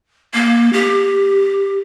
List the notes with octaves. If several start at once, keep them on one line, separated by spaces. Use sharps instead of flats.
A#3
G4